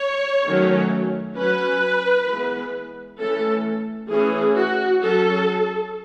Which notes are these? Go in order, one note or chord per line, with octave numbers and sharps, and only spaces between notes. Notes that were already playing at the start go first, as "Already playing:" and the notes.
Already playing: C#5
D#3 F#3 A3 C#4
F#3 C#4 B4
E3 G#3 B3
E3 A3 C#4 A4
E3 A3 C#4 G#4
F#4
F#3 C#4 A4